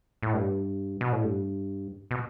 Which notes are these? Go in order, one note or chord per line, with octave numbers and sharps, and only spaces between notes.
A2
G2
B2
A2
G2
B2